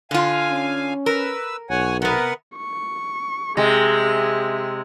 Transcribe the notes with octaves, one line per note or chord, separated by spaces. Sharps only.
D3 F4 F5 G#5
C#4
A#4 B4 E6
B1 C#5 F#5 G#5
C3 B3 A#4 B4 F#5
C#6
C3 G#3 G#4 E5